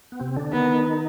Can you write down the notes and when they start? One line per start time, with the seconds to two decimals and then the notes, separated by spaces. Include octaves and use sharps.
0.12 B3
0.20 C3 C4
0.36 D3 D4
0.52 D#3 B3 D#4